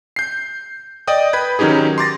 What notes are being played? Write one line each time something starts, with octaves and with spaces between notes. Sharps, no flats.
G6 C7
D5 D#5 G5 D#6
B4 B5 G6 G#6
D#3 F#3 C#4 D#4 G4 G#4
C6 D6 A6 A#6